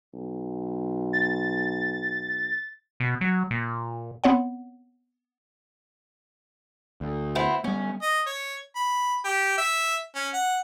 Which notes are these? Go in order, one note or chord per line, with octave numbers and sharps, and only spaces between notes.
B1
A6
B2
F#3
A#2
B3 C4 C#5 F#5
D2
B3 C4 E4
G3 B3 C#4
D#5
C#5
B5
G4
E5
C#4
F#5